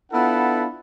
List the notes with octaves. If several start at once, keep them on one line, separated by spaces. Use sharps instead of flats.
B3 D4 E4 F4 A4 F#5